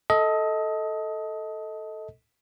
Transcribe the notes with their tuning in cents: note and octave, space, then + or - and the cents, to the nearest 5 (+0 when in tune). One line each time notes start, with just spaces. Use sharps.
A4 +0 D#5 +25